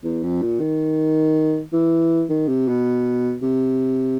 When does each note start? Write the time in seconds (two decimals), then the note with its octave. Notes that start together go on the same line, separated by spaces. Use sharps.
0.03 E2
0.23 F2
0.42 A#2
0.60 D#3
1.73 E3
2.30 D#3
2.48 C3
2.68 B2
3.42 C3